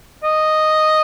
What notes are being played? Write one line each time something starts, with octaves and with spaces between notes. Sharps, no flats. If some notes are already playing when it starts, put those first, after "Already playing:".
D#5